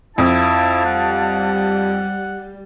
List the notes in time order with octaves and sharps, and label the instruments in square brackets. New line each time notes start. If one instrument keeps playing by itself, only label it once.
[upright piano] F2 [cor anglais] E4 [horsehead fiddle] F5 A5
[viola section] G3 [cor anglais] F#5